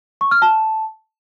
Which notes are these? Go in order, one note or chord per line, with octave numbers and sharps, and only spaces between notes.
C#6
F6
A5